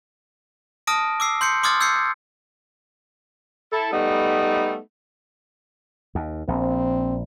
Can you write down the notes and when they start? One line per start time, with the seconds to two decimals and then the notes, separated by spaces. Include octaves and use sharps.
0.87 A5 D#6 F6 A#6 D7
1.20 D6 E6 C7
1.41 C6 G6 C7 C#7
1.63 C6 D6 D#6 F6 G#6 A6
1.81 E6 G6 G#6 C7 C#7
3.73 E4 A4
3.93 G3 A3 B3 D#4
6.15 D#2
6.48 A#1 C4